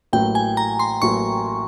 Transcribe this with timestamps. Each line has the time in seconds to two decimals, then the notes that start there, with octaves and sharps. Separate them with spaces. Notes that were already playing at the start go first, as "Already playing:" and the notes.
0.13 A1 A2 F#3 A#3 G5
0.35 G#5
0.57 A#5
0.79 C6
1.02 A1 A2 F#3 A#3 C#6